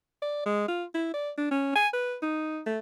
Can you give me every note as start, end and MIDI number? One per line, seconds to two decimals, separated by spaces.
0.22 0.42 74
0.46 0.68 56
0.68 0.84 65
0.95 1.13 64
1.14 1.31 74
1.38 1.49 62
1.51 1.74 61
1.75 1.88 80
1.93 2.16 71
2.23 2.60 63
2.66 2.79 57